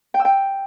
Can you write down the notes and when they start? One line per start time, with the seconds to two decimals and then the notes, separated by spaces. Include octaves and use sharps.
0.14 G5
0.19 E6
0.25 G5